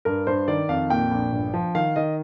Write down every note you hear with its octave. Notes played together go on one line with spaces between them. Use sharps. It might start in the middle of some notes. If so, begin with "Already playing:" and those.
G2 A#4
G2 C5
D#3 D5
F2 F5
A#2 G5
A#1
G1
F3
D#3 F5
D#3 D#5